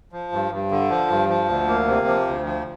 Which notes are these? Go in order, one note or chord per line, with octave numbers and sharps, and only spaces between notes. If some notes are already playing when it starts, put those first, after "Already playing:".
F3
G2
G2
D3
F3
G2
F3
D2
A#3
C3
F3
D2
F3